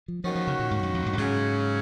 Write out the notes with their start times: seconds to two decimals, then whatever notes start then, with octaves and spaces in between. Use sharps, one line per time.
0.08 F3
0.24 D#3 F3 A#3 C#4 F#4
0.35 F3
0.47 C#3
0.59 A#2
0.71 G#2
0.83 F#2
0.94 F2
1.06 G#2
1.13 F#2
1.17 G#2 C#3 F#3 C#4